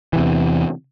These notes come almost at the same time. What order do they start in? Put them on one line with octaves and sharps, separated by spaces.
E3 C3 E2